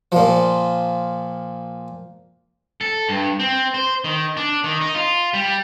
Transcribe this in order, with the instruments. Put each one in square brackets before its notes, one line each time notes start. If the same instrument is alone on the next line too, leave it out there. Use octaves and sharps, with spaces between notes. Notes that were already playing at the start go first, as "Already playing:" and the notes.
[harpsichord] A#2 F3
[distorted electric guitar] A4
G2
C4
C5
D#3
D4
D#3
D#4
F4
G3